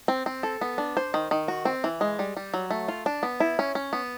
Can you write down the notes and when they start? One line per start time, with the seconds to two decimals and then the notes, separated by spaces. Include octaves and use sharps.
0.08 C4
0.26 C4
0.43 A4
0.61 B3
0.78 D4
0.97 C5
1.14 D#3
1.31 D#3
1.48 F#4
1.65 C4
1.84 E3
2.01 G#3
2.19 G3
2.37 G3
2.54 F#3
2.71 A3
2.88 F4
3.06 D4
3.23 B3
3.40 E4
3.59 C#4
3.75 C#4
3.93 B3